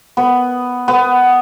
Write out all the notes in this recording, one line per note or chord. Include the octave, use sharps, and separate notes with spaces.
B3
B3